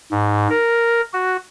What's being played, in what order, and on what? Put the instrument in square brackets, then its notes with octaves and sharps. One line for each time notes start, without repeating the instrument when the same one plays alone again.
[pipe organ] G#2
A#4
F#4